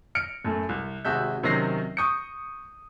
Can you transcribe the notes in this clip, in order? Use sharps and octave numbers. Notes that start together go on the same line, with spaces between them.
F6 C#7 D7
F#2 A3
C2
G#1 C3 F#4 G#4 E5 G6
C3 D#3 F#3 C#4 A#6 C7
C#6 D#6 G6 C#7